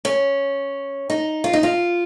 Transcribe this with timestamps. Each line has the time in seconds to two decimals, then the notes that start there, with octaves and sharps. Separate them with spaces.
0.05 C#4
1.10 D#4
1.44 F4
1.53 D#4
1.63 F4